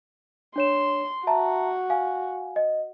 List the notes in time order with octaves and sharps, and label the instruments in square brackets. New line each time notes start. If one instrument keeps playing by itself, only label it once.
[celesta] D4 C#5 E7 [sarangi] C6
[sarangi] F#4 [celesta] E5 A5 A#5
[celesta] F5 G#5
D#5